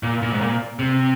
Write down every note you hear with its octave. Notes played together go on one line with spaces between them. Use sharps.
A#2
A#2
G#2
A#2
C3